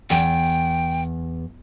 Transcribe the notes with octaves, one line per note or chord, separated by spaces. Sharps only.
E2 G5